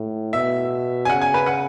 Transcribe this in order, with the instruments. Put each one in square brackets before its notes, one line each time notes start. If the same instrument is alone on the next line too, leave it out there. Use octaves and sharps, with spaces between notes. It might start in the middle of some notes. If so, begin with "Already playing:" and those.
Already playing: [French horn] A2
[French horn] B2 [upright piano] E5
[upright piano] G#5
[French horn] C#3 [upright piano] F#5
[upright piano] G#5
B4
F#5